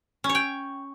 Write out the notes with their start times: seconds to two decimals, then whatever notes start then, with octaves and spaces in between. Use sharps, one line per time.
0.24 C#4
0.29 C#5
0.35 G5